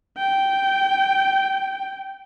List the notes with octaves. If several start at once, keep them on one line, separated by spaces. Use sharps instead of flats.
G5